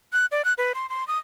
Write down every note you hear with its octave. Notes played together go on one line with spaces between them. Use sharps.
F#6
D5
F#6
B4
C6
C6
D#6